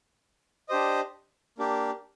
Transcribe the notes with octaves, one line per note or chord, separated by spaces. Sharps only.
D4 G4 C5 D#5
A#3 D4 G4